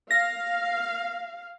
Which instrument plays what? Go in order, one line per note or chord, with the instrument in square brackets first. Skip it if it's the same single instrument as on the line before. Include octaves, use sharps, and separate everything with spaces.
[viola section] F5 [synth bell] A#6